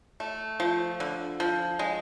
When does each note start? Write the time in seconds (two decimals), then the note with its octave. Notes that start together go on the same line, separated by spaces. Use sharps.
0.20 A3
0.60 F3
1.00 D3
1.40 F3
1.79 G#3